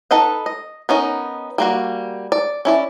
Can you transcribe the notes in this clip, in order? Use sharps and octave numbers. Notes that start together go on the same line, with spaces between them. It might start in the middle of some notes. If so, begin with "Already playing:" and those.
D#4 A4 B4 D#5 F#5
D#5
B3 C#4 D#4 A#4
G3 A#3 F#4
D5
C#4 E4 D5